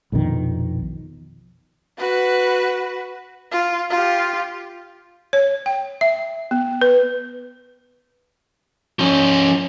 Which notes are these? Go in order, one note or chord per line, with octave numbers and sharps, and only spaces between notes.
A#1 F2 B2 D#3
F#4 B4
F4
F4 G4
C#5
G5
E5
B3
B4
F3 C#4